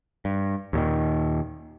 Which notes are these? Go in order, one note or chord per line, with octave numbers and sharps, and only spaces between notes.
G2
D#2 A#2 D#3